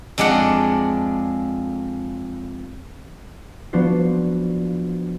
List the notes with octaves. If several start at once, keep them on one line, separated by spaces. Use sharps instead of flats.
F2 G#3 D4 D5 F#5
F3 B3 D4 F#4 C5